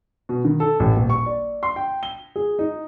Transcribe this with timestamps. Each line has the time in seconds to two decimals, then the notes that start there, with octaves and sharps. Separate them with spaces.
0.29 B2
0.45 D#3
0.60 A4
0.80 A1
0.96 D#1
1.10 C#6
1.26 D5
1.63 C6
1.76 G5
2.03 G7
2.36 G#4
2.59 D#4